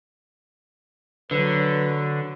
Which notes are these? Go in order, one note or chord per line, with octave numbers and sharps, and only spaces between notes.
D3 F#3 B4